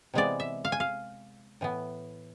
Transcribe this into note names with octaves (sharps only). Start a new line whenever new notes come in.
C3 E3 G#3 B3 D5
E5
F5
G#5
F5
A2 E3 B3